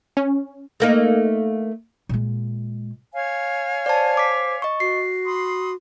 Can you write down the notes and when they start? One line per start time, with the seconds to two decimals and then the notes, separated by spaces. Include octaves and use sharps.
0.17 C#4
0.80 A3 A#3 D#4
2.09 A#2 G#3
3.14 C#5 F5 G#5
3.86 C5 D5 A5
4.17 D6 B6
4.62 D#5 C#6
4.80 F#4 C7
5.26 B5 C6 D#6